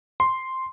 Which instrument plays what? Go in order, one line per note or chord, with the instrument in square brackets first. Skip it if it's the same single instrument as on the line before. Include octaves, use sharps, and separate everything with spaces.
[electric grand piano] C6